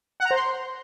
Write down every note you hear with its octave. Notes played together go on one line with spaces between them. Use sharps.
F#5
A#5
C5
C6